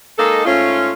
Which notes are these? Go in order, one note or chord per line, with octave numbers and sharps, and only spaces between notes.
G#3 A#3 D#4 A4
G#2 A3 C#4 F4